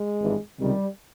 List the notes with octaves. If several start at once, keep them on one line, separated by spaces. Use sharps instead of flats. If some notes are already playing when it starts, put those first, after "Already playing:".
Already playing: G#3
G#1 G2 E3
C#2 C3 D#3 G3